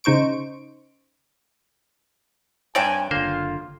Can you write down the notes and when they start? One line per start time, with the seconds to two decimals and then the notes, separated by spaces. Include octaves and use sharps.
0.04 C#3 D#4 C5 C#6 D7
2.75 G2 C4 C#5 D5 G5 G#5
3.11 F#1 D3 A#3 F4 C5